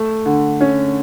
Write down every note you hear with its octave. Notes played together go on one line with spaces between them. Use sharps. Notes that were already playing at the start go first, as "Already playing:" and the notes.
Already playing: A3
D3
C#4